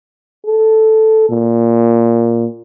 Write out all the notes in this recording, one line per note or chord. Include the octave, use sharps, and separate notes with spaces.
A4
A#2